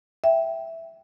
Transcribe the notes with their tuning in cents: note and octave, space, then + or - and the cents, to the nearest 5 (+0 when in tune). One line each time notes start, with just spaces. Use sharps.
E5 +0 G5 +0